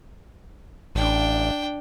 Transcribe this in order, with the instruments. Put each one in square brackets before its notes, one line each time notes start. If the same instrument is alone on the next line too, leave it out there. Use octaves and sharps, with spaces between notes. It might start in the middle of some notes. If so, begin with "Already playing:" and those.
[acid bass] A1 [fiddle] D4 G5